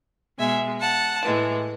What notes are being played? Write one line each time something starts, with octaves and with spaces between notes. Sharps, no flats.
B2 G#3 E5 G#5
F#5 A5
A2 E3 G#3